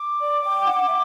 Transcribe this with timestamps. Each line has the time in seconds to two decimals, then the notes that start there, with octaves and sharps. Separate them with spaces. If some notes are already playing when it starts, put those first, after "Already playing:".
Already playing: D6
0.21 D5
0.44 G5
0.66 F#5
0.88 E5